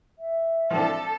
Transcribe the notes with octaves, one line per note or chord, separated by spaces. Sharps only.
E5
F3 C4 D4 A4